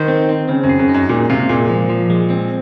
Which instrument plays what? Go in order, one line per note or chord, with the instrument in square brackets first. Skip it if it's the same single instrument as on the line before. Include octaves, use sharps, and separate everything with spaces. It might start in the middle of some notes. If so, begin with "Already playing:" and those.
Already playing: [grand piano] D#3 [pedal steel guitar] C5
[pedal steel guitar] C4
C4
[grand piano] C#3 [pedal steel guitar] C4
[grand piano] F#2
[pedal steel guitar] G#4
[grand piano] F#2
[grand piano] F#2 [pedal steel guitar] D#4
[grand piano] A#2 [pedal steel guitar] G#3
[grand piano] C3 [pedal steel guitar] F4
[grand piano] A#2 [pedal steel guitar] G#3
[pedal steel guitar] F3
F3
G#3
C4